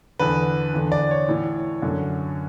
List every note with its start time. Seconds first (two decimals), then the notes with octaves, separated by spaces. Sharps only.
0.19 E2 D3 B4
0.74 E2 D3
0.92 D5
1.11 C#5
1.29 A2 E3
1.82 F#2 D3